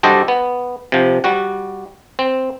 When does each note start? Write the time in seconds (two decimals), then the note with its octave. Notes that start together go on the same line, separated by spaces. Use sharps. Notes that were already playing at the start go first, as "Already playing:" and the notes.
0.03 G3 D4 F#4 A4 C5 D#5
0.28 B3
0.92 C3 F3
1.24 G3 F#4 F#5
2.19 C4